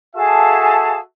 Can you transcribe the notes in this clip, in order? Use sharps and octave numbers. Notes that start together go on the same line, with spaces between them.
F#4 G#4 A4 E5 F5 A5